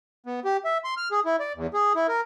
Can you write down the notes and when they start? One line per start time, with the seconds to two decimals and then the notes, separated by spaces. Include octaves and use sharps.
0.26 B3
0.45 G4
0.65 E5
0.84 C6
0.97 F6
1.11 G#4
1.25 E4
1.40 D5
1.55 E2
1.74 G#4
1.95 E4
2.08 A#4